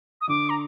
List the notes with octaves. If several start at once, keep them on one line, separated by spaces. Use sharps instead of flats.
D#6
D3 D6
A#5